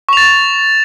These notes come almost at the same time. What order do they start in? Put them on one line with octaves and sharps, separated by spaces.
C#6 F7 A6